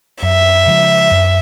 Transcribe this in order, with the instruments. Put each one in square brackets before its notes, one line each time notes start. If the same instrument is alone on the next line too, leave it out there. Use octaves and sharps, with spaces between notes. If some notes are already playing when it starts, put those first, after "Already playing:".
[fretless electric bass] F#2 [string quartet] E5
[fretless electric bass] C#3 F3 G#3
F#2